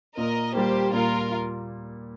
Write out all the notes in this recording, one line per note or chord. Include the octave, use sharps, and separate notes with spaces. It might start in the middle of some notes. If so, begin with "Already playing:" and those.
A#2 A#4 D#5
G3 A#3 G4 C5
A#2 F4 A#4